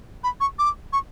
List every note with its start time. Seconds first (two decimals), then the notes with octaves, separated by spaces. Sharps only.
0.24 B5
0.40 C#6
0.59 D6
0.93 C#6